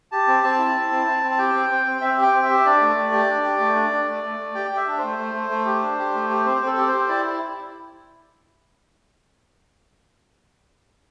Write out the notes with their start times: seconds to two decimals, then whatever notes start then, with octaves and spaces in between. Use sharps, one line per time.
0.12 G4 A5
0.27 C4
0.43 C4 A5
0.59 E4
0.74 E4
0.91 C4
1.07 C4
1.23 C4
1.31 A5
1.38 G4 G5
1.54 C4
1.70 C4
1.86 C4
2.01 C4 E5
2.17 G4
2.22 G5
2.33 C4
2.44 E5
2.49 G4
2.65 D4 D5
2.81 A3
2.96 A3
3.12 G4
3.29 D4
3.44 G4
3.60 A3
3.76 D4
3.91 D4
4.08 A3
4.24 A3
4.40 A3
4.55 G4 G5
4.71 G4
4.77 E5
4.87 D4
4.98 C5
5.03 A3
5.18 A3
5.35 A3
5.50 A3
5.65 G4
5.82 D4
5.98 G4
6.14 A3
6.30 G4
6.45 C4 C5
6.61 C4
6.66 A4
6.77 G4
6.88 G4 C5
7.09 E4 D5